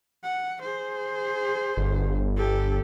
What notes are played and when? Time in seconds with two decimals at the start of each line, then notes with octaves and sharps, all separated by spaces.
0.24 F#5
0.62 G#4 C5
1.77 G1
2.37 G4 A4